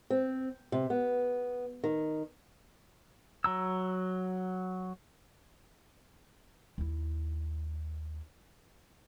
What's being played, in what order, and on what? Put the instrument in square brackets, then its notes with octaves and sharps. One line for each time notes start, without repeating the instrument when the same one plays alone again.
[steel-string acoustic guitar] C4
C3
B3
D#3
[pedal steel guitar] F#3 A#5 E6
[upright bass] D#2 E4